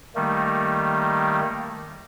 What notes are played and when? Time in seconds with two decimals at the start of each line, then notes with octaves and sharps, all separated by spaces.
0.15 D#3 G3 A3 A#3